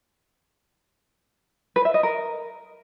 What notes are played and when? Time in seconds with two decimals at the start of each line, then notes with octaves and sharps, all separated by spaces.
1.76 B4
1.85 E5
1.94 D#5
2.03 A#4